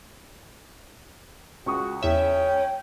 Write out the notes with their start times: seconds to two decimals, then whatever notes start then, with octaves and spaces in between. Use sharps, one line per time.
1.66 C#2 F#4 C#6 D#6
2.03 E2 C#4 E5 G5